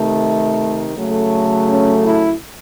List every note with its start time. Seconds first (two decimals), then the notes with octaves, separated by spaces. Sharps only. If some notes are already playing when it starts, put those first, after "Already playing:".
Already playing: C3 D#3 A3
0.95 C#3 F#3 A3
1.68 C#4
2.04 E4